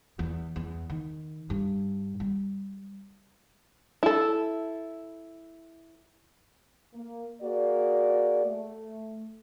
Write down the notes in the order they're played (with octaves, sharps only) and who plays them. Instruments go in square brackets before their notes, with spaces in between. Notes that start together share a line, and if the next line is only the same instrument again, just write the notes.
[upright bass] E2
E2
D#3
G2
G3
[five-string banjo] E4 A4
[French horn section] A#3
A#3 F#4 G#4 D5
A3